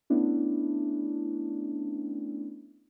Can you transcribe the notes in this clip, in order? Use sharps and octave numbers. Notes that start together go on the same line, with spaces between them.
A3 B3 C#4 D4 E4